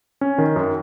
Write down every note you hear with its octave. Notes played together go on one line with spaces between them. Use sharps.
C#4
D#3
F#2